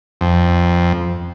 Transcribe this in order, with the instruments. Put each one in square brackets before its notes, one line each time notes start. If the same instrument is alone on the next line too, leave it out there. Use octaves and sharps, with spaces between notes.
[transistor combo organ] F2